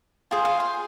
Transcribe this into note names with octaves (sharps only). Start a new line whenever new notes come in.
F4 G#4 C5 G#5
F5
C6